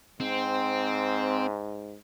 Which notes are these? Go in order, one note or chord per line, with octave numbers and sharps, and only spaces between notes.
G#2 C4